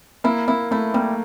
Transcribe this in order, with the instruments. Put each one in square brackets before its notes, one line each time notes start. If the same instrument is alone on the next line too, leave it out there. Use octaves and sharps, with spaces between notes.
[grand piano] A#3 [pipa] E4
[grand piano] A#3 [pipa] E4
[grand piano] A3 [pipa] E4
[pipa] G3 [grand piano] A#3